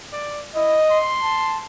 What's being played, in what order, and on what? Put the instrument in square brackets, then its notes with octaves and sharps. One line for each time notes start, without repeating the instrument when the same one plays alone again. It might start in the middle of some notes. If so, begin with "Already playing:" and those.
[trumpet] D5
[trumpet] E4 [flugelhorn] D#5
[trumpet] C6
[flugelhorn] A5